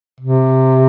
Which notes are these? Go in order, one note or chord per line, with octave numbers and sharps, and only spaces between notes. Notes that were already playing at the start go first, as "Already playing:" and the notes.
C3